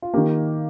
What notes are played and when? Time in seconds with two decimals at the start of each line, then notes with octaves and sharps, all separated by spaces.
0.02 F4
0.14 D#3 A#3 G4